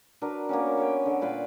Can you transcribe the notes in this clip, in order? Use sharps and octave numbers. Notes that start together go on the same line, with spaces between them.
D4 F#4 A#4 B4
A#3 B3 C#4
B4 C#5 G5
D3
A#2 B4 F5 G5